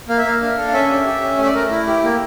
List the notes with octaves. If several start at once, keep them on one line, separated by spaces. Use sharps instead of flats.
A#3 F5
E5
A#3 F5
D4
A4
F5
C#4 E5
G4
G4
C#4
A3 E5
D5
A3 A#4
E4
G4
A#3